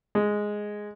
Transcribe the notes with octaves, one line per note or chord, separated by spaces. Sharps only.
G#3